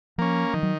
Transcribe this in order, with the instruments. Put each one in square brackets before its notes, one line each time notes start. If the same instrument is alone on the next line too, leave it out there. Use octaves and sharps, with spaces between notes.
[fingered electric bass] F3 [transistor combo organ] A#3 C#4
[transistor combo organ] D#3 [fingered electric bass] F3
[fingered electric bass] F#3